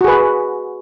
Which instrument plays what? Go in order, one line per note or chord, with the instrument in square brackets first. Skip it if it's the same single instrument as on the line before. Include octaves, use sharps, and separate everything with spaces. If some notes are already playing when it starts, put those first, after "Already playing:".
[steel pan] F#4
G#4
B4